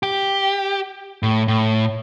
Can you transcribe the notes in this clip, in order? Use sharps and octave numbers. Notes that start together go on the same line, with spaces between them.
G4
A2
A2